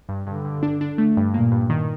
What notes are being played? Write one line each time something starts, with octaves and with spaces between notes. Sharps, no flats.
G2
G2 D3
G2
D4
D4
A3
G2
A#2 A#3
G2
D#3